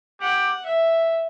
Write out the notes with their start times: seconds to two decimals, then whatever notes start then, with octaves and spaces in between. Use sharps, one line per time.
0.20 G4 F#5
0.66 E5